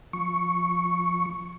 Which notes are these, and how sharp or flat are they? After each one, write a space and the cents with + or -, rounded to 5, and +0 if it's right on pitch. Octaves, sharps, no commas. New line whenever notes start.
F3 +10 C#6 +0